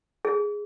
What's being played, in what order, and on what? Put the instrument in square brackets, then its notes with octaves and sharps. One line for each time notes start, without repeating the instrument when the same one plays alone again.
[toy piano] G#4